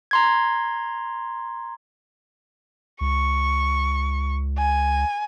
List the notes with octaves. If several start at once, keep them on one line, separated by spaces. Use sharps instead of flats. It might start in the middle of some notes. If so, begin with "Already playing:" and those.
A#5 C6 G#6
C#2 C#6
G#5